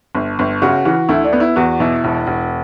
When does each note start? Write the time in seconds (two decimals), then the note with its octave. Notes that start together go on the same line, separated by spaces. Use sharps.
0.15 G1
0.39 G1
0.62 C#3 F#4
0.85 E3 F#4
1.09 D2 E4
1.25 D4
1.33 B3
1.40 E4
1.56 E2 F#4
1.80 B2 E4
2.04 E1
2.27 E1